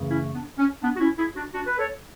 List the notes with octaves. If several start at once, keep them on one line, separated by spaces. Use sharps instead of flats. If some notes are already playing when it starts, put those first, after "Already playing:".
Already playing: F#2 C#3 E3 A3
C#4 E4
B3 D4
C#4
B3 D4
F#4
C#4 E4
E4 G#4
D4 F#4
D4 F#4
B4
A4 C#5